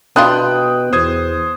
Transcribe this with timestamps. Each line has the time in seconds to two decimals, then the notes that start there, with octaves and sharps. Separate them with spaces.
0.16 B2 D4 E4 F4 G5 D#6 F#6
0.93 E2 C5 D#6 G#6